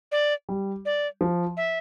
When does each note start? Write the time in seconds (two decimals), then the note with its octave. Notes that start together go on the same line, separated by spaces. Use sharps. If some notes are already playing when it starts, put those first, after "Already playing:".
0.12 D5
0.49 G3
0.86 D5
1.21 F3
1.57 E5